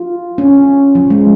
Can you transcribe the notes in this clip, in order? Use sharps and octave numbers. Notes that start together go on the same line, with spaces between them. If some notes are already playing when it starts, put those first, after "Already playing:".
Already playing: F4
C#4
F3
G#3